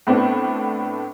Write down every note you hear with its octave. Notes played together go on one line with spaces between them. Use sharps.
A2 B3 C4 D4